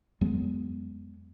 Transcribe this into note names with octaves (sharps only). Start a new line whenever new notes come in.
F2 F#3 G#3 B3